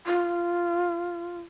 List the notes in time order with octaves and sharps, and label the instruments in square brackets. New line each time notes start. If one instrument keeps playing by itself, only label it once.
[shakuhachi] F4